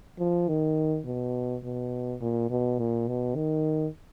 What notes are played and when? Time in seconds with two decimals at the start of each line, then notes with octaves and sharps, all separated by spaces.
0.19 F3
0.48 D#3
1.05 B2
1.64 B2
2.21 A#2
2.50 B2
2.79 A#2
3.08 B2
3.35 D#3